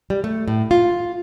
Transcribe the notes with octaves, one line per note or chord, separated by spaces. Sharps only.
G3
A3
A2
F4